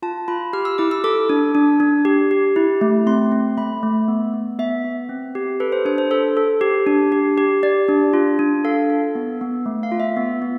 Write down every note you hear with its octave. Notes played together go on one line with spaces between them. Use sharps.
F4 A5
F4 B5
G4 F6
E6
E4 D6
E6
A4 D6
D4
D4
D4
G4
G4
E4
A3
C4 C6
C4
A3 B5
A3
B3
B3
B3 E5
B3
C4
G4
A4 B4
C5
D4 C5
C5
A4 C5
A4
G4
D4
G4
G4
G4 D5
D4
F4
D4
A4 F5
A4
B3
B3
A3
F5
F4
E5
B3
B3